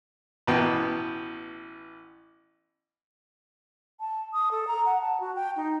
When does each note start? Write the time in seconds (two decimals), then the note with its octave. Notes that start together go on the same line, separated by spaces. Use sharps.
0.47 A1 B2 B3 G5
4.00 A5
4.33 D#6
4.51 A4
4.67 A#5
4.86 F#5
5.01 A5
5.20 F#4
5.36 G5
5.56 D#4